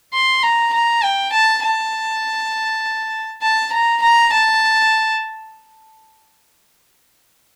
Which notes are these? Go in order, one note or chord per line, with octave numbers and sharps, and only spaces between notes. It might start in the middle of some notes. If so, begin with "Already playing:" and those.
C6
A#5
A#5
G5
A5
A5
A5
A#5
A#5
A5